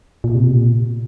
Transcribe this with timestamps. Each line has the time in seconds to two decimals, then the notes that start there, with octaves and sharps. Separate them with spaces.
0.24 A#2
0.35 C3
0.45 A#2